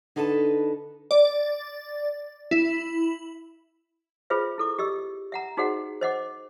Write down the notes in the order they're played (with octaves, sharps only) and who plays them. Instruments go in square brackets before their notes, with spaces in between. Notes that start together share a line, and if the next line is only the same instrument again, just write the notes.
[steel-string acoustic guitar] D3 D#4 A4 B4 C#5 A5
[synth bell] D5
E4
[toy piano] F4 G#4 B4 C5 E5
E4 A4 D6
G4 D#5 E6
E5 F#5 A#5
D#4 F#4 G#4 C5 D#5 F#5
C5 D#5 F#5 D6